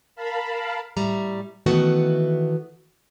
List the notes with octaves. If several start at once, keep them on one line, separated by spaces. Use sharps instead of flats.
A#4 F5 A5 B5
A2 G3 E5 A#5
D#3 E3 A3 B3 F#4